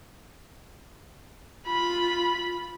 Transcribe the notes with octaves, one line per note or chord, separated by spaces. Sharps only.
F4 B5